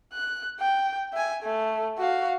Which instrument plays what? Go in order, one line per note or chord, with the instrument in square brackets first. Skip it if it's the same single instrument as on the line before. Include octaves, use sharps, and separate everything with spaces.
[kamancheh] F#6
G5
E5 G#5
A3
F#4 F5